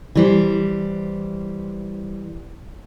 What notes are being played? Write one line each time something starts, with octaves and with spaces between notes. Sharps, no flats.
E3 G3 C5